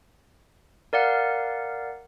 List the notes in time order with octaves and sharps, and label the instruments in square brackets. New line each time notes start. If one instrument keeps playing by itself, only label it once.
[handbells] A#4 D5 F5 F#5